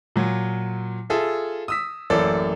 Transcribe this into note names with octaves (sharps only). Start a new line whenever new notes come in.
A#2 F#3
F4 G#4 A4 E5
D#6 E6 B6
A1 F#2 A#3 A4 D5